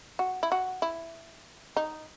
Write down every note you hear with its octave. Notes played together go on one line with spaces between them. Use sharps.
F#4
E4
F#4
E4
D#4